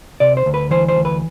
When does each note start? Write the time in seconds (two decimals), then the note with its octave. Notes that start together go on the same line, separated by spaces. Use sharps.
0.20 C3 D5
0.37 C5
0.46 D2
0.54 B4
0.71 E3 C5
0.88 C5
0.96 D2
1.05 B4